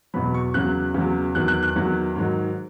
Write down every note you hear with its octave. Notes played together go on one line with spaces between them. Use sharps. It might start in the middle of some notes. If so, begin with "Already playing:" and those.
E2 B2 F#3 B5
C#6
E2 C#3 F#3 F#6
E2 C#3 F#3
E2 D#3 F#3 F#6
F#6
F#6
E2 D#3 F#3
G#2 D#3 F#3